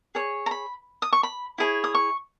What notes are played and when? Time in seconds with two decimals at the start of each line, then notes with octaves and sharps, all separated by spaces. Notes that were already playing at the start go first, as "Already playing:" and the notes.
0.15 G#4 C#5
0.46 A#5
0.51 B5
1.02 D#6
1.13 C#6
1.23 B5
1.58 E4 G#4 C#5
1.84 D#6
1.95 C#6